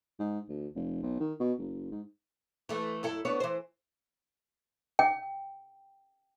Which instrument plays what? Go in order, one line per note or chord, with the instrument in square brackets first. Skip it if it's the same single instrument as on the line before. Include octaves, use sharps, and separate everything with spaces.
[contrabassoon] G#2
D2
F1
B1
D#3
B2
F#1
G#2
[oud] E3 A3
F#2 E4 A4
B3 D4 C#5
E3 C5
[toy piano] G5